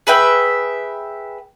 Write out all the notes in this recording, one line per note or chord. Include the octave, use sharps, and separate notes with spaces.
G#4 B4 E5 G5